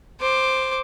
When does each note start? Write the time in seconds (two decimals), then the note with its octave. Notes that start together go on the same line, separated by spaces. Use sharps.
0.20 C5 D6